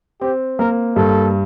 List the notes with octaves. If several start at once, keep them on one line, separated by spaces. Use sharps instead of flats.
C4 G4
A#3 A#4
G2 A4